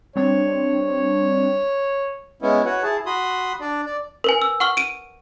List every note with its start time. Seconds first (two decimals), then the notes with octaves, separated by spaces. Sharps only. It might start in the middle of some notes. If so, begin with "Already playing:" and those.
0.16 G3 C4 D4 C#5
2.42 G#3 B3 C#4 E4
2.65 F#4 B4 C#5 F#5
2.83 E4 G#4 A5
3.06 F#4 B5 C6 D#6
3.61 D4 D5
3.86 D5
4.24 A#4 B4 G#5
4.42 E6
4.60 F#5 C#6 F6 G7
4.77 D7 D#7